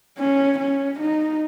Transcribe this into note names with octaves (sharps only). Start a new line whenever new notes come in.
C#4
C#4
D#4